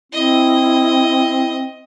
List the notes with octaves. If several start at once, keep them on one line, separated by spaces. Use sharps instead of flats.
C4 E4 D#5